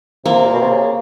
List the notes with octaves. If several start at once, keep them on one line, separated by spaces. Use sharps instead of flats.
C3 A#3
A#2
B2
C3
C#3